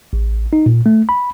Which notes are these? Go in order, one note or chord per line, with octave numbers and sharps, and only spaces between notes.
A1
D#4
A#2
A3
B5